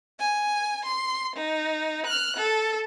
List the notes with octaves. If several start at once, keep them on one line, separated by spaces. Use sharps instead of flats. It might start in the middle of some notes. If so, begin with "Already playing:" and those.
G#5
C6
D#4
F6 F#6
A4